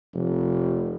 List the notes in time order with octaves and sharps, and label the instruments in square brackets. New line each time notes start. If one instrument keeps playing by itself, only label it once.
[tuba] F1